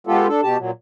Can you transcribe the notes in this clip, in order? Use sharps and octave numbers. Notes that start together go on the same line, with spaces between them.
G#3 B3 F4 G4 A4
D4 A4
B2 G4 A5
A#2 F#3